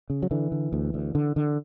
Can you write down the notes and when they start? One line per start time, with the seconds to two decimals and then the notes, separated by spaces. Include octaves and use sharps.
0.10 C#3
0.22 F#3
0.31 D3 E3
0.52 D3
0.73 D2
0.94 D2
1.15 D3
1.36 D3